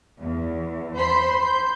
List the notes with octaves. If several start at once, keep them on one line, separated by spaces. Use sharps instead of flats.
E2
C5 B5 C6 G6
G6